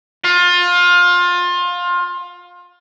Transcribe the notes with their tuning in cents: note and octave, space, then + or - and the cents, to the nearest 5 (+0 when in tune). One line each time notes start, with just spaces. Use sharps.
F4 +25